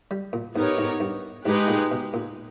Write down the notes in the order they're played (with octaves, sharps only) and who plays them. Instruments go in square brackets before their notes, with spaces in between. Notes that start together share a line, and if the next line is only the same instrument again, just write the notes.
[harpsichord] G3
A#2
[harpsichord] G#2 [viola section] B3 D#4 G4 A#4 C#5
[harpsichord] G#2
G2
[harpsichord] G#2 [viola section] G#3 D#4 G4 B4
[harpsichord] A#2
B2
A#2